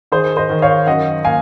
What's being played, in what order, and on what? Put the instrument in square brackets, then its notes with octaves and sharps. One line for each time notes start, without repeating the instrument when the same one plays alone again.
[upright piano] D#3 G#4 C5
C5 D#5
D#3
C#5 F5
F#2 D#5 F#5
A#3 F5 G#5